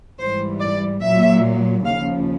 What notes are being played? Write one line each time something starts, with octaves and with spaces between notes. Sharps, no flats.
G#2 E3 G3 C5
D5
A#2 F#3 E5
D#2 C#3 F3 F5